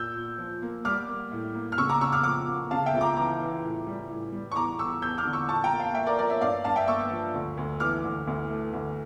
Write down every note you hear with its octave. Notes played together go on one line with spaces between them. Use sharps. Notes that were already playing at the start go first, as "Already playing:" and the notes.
Already playing: A#2 E6 G6
A#2
F3
A#3
G3 D6 F6
A#3
A2
A#3
F6
C#3 C#6 E6
A#5 D6
C#3 C#6 E6
D6 F6
F3 D6 F6
A#3
C#3 F5 A5
E5 G5
C#2
A#5 D6
E3 A#5 D6
E3
A2
G3
A2
G3
C#6
E2 A#5 D6
E2 C#6 E6
E2 E6 G6
D6 F6
D3
C#6 E6
A#2 A5 C#6
G5 A#5
A#3
F5 A5
A#3 E5 G5
A#4 D5
F3 A#4 D5
C#5 E5
G2 D5 F5
G2 F5 A5
E5 G5
A#3 C#6 E6
F3
D2
D2
E3 D6 F6
D2
D2
A3
D2